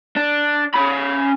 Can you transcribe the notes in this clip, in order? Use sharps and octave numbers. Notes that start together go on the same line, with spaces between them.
D4
C#4 B5